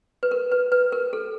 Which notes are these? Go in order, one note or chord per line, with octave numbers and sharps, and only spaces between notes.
B4
A#4
B4
B4
A#4
A4